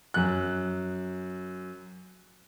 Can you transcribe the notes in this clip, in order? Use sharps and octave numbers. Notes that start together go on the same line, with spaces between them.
F#2 F#6